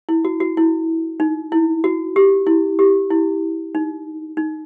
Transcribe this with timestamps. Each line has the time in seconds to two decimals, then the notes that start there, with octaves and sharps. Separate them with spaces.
0.09 E4
0.25 F#4
0.40 F#4
0.57 E4
1.20 D#4
1.52 E4
1.84 F#4
2.16 G4
2.47 E4
2.79 G4
3.11 E4
3.75 D#4
4.37 D#4